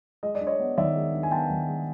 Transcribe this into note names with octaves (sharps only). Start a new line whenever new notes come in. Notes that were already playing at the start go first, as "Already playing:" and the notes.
G#3 D#5
D5
D4
C#5 D#5
B3
D#3 D5 E5
G#3
D4
G#5
B3 G5 A5
D#3
G#3